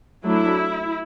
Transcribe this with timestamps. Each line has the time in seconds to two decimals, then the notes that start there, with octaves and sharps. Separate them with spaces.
0.25 F#3 A3 D4 E4